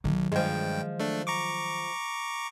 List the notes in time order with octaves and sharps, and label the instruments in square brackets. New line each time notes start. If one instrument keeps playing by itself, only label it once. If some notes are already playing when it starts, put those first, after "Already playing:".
[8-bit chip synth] B1 [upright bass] D#3 F#3
[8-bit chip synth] G2 G5 [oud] F3 G#3
[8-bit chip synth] A3 D4
A#5 C#6 D6